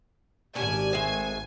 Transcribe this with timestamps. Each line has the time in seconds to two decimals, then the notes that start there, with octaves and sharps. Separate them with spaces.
0.55 G#1 C#4 D4 G4 G#5
0.93 G#3 A3 C4